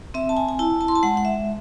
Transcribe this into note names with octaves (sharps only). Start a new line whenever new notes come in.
C4 E5
A5
G#5
G#5
E4 A5
A5
C6
A5
G#3 F#5
F#5
E5